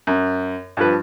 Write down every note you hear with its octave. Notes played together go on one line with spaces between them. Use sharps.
F#2
G2 F3 B4